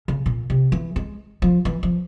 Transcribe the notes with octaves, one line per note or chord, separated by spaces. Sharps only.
C#3
A#2
C3
E3
G#3
F3
E3
F3